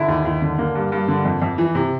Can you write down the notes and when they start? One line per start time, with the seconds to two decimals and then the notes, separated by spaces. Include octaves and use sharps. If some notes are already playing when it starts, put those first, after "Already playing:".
Already playing: D3 E4
0.08 D#2
0.25 D#2
0.42 D3
0.58 D3 A#3
0.75 G2
0.92 G2
1.08 D3
1.25 F2
1.42 F2
1.58 E3
1.75 C3